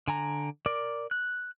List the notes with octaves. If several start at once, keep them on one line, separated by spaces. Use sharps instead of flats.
D3 G#5 A#5
A#4 D5 D6
F#6